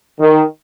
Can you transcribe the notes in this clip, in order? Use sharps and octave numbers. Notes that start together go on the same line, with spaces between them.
D#3